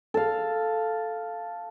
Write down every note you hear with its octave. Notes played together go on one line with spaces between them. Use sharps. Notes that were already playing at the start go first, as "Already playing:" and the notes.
A4 F5